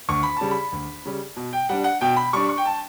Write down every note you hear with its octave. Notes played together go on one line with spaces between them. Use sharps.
D2 C#6
B5
C#3 G3 A5
B5
D2
C#3 G3
B2
G5
G3 D4 F#5
F#5
B2 G5
B5
G3 D4 C#6
C#6
G5
A5